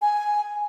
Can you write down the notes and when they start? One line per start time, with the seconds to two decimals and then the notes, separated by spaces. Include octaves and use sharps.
0.02 G#5